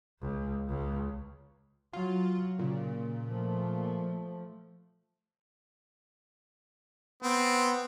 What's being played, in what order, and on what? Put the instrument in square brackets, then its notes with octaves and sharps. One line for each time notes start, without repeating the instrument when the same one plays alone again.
[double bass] C#2
C#2
[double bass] F#3 [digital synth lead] F4
[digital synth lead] A#2 [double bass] C#3
[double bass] F3 A3
[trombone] B3 [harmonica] C4